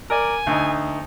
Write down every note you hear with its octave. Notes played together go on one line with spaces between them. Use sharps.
A#4 D5 G#5
D2 D#4